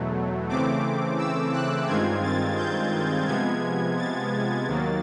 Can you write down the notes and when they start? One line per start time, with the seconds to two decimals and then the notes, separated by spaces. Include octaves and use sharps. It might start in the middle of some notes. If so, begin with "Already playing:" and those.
Already playing: E2 B2 F#3 A3
0.49 C#3 E3 A3 C4 D6
1.18 E6
1.53 F#6
1.87 G2 D#3 G#3 C4 F4 G#6
2.23 A6
2.57 G6
3.26 C3 F3 G#3 B3 G#6
3.97 A6
4.67 D#2 D#3 F#3 A#3